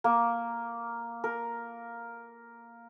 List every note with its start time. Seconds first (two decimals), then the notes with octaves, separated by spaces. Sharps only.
0.04 A#3
1.24 A#4